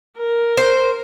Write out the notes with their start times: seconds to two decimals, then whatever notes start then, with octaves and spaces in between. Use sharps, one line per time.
0.18 A#4
0.57 C5